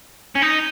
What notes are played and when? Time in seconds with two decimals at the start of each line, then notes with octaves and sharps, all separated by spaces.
0.36 C#4
0.42 D#4